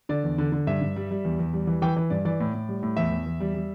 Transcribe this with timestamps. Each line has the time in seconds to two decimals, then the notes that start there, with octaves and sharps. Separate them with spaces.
0.09 D3 D5
0.23 E2
0.38 D3
0.52 D3
0.67 G2 E5
0.81 G2
0.96 G3
1.11 G3
1.24 E2
1.39 E2
1.53 G3
1.67 E3
1.82 E3 G5
1.96 E3
2.10 G2 D5
2.25 E3 D5
2.40 A2
2.54 A2
2.69 G3
2.83 A2
2.97 E2 E5
3.11 E2
3.26 E2
3.40 G3
3.54 G3